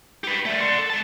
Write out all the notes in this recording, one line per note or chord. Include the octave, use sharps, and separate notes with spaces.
G4 B4
G3 A3
D5 C6
A4
G#3 A5